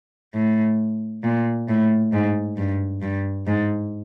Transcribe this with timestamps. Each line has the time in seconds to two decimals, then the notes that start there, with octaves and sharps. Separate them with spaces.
0.34 A2
1.24 A#2
1.69 A2
2.13 G#2
2.57 G2
3.02 G2
3.47 G#2